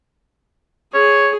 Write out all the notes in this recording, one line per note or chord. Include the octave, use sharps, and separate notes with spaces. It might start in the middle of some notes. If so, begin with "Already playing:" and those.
G#4 C#5